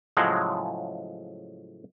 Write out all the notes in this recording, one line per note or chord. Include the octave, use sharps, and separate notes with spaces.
A2 C#3 F3 F#3 G#3